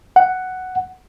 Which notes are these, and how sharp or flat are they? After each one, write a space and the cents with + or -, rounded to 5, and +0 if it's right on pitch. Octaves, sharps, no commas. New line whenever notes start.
F#5 +5